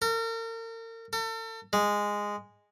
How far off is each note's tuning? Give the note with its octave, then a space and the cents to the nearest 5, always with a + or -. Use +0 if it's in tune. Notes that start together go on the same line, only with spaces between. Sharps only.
A#4 -40
A4 +40
G#3 -10